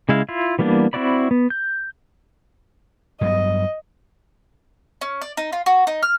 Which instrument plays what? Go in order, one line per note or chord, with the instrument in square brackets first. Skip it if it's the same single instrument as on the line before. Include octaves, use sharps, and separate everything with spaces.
[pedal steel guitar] C#3 G#3 E4 F5
E4 F4
E3 G3 A#3 B3 D4
C4 E4 F#4 D5 B5
B3
G6
[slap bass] G2 F#3 B3 [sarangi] D#5
[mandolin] C#4
D5
D#4
F4
F#4
D#4
F6